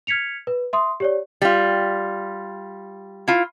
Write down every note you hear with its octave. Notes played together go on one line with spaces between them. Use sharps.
F6 G#6 B6 C#7 F7
B4
E5 C6 D#6
G4 C#5 D5
G3 F4
E4 F4